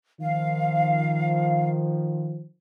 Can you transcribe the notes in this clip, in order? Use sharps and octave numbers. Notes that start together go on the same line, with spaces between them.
D#3 F3 F5